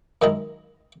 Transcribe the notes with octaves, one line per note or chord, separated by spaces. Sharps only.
F#2 D#3 G#3 E4 D#5 A#5